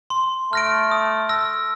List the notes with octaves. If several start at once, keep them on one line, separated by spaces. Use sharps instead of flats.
C6
A3 F6 A#6 D7
D#6
E6 A#6